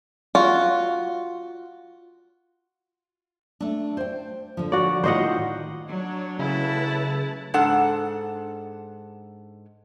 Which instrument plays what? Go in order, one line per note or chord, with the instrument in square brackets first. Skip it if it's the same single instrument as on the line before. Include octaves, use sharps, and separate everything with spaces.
[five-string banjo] F4 F#4
[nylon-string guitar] A3 D4
C5 G5
D3 F3
[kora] F#4 D5
[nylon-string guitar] A2 D#3 F4 [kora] C5 D#5 F#5
[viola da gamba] F#3 [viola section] D4 C#5
[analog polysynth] C#3 [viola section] A3 B4 A5 [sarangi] E4
[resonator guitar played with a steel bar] G#2 D4 A4 F#5